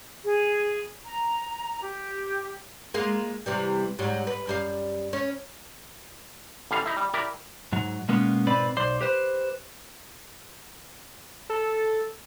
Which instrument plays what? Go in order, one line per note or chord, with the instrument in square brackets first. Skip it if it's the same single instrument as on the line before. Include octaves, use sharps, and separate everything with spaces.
[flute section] G#4
A#5
G4
[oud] G#3 A#3 F4
C3 E3 G3
G#2 F#3 G3
B4
F#2 G3 F5
C#4
[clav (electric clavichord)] A1 D3 G3 C#4 F5
D#4 E4
G3
E4 G4 A#4 D5
[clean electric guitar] G#2 F#3
B2 G#3 A#3 B3 C#4
G#2 B2 C4 B4 D5 B5
B1 C5 D5 C6
G4 B4 C5
[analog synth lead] A4